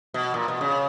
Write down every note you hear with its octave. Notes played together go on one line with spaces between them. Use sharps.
B2
A#2
B2
C#3